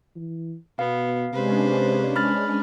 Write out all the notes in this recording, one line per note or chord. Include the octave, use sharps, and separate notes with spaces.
E3
B2 B3 F5
C3 G#3 C#4 D4 B4 C5
B5 F6 A6